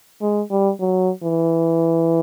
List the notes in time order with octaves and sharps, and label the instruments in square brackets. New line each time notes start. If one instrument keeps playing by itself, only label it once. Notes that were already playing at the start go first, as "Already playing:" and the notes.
[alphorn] G#3
G3
F#3
E3